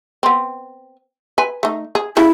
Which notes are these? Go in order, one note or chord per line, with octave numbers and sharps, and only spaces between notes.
B3 C4
B4 G#5
A3 D#4
G#4
C#3 E3 G3 E4